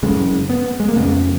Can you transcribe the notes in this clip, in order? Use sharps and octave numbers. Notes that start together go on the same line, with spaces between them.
F#2 C#3 G#3
B3
G#3
A#3
F2 C#3 B3